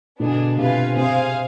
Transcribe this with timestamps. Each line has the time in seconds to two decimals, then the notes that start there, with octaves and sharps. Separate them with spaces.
0.20 B2 D3 B3 D4 G#4
0.57 C3 F4 B4 F5 G#5
0.96 C3 G#4 C5 F5 G#5